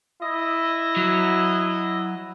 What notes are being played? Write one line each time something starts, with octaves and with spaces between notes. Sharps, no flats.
E4 D#5
F#3